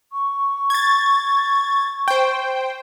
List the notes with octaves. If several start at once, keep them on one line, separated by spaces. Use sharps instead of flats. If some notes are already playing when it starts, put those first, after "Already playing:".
C#6
G#6 A6
C5 G5